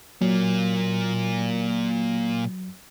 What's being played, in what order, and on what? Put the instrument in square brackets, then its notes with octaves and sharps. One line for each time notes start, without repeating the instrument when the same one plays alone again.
[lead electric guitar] A#2 A#3 [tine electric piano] F#3